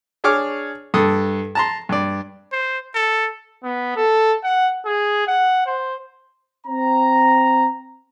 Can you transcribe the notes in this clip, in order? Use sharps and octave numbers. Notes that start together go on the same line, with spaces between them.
D4 G#4 C#5 C#6 D6 F6
G2 A4 D#6
A5 A#5 C6
G2 D5
C5
A4
B3
A4
F#5
G#4
F#5
C5
C4 A#5